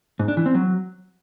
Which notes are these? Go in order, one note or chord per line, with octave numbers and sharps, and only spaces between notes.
G#2
D4
E3
C4
F#3